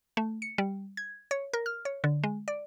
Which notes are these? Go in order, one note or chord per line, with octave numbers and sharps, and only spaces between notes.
A3
C#7
G3
G#6
C#5
A#4
F6
C#5
D3
G#3
D5